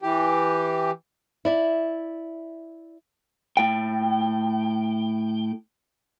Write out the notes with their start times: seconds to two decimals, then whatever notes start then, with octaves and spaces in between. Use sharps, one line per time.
0.02 E3 G4
1.45 E4 D5 E5
3.57 A2 G5